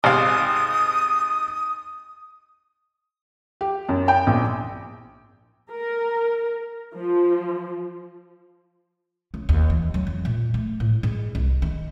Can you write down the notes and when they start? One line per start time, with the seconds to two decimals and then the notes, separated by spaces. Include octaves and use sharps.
0.04 G#1 C3 F5 D#6
3.61 G4
3.89 F#2
4.08 G5
4.27 A#1
5.71 A#4
6.96 F3
9.34 C#3
9.49 D#2
9.70 E3
9.94 F#3
10.07 F2
10.25 A#2
10.54 A3
10.80 A2
11.03 G#2
11.35 C2
11.62 D#3